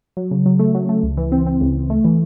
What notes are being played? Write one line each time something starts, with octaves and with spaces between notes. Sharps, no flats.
F#3
C#3
F#3
A3
F#3
A3
C#2
E3
C4
C4
C#2
C#2
A3
E3